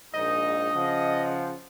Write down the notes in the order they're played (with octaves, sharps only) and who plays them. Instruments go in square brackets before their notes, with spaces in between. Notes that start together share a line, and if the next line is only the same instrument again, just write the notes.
[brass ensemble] A#1 G#2 D#4 [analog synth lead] D#5
[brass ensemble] C#3 F3 F#5